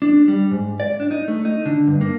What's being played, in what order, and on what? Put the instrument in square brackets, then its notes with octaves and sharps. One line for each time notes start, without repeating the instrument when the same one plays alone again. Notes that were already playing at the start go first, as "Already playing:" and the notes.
[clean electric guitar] D4
G3
G#2
D5
D4
D#4
A3
D#4
D3
G2
A#3